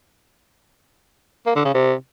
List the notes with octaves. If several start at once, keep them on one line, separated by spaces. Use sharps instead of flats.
A#3
D3
C#3
C3